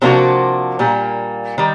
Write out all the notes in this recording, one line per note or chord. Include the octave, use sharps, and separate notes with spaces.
C3 F3 A#3 D4 F#4
A#2 G3 A#3
D#3 G3